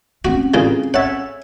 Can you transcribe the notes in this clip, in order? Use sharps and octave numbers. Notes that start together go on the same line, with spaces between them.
C4 C#4 F#4
A1 A#2 C#3 G#4
C#5 E5 F#5 A5